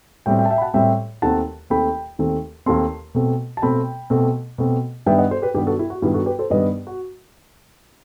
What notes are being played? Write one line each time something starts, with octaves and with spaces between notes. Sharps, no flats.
A2 G3 C4 E5 G5
E5 G5
A5
E5 G5
B5
F#5 A5
A2 G3 C4 E5 G5
D#2 D#3 A3 C4 F#5 A5
D#2 D#3 A3 C4 G5 B5
D#2 D#3 A3 C4
D#2 D#3 A3 C4 A5 C6
B2 A3 C4
A5
B2 A3 C4 G5 B5
B2 A3 C4
B2 A3 C4
G2 D#3 G3 B3 E5 G5
D#5 F#5
A4 C5
G4 B4
G2 D#3 G3 B3 G4 B4
F#4 A4
E4 G4
F#4
G2 D#3 G3 B3 E4 G4
F#4 A4
G4 B4
A4 C5
G2 D#3 G3 B3 B4 D#5
F#4